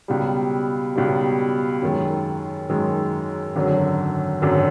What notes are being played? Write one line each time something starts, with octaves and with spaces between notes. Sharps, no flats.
C#2 B2 G3
C#2 B2 G3
F#2 D#3 G#3
F#2 D#3 G#3
G#1 F#2 D3 F#3
G#1 F#2 D3 F#3